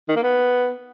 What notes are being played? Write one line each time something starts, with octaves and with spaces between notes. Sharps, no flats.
D#3
A#3
B3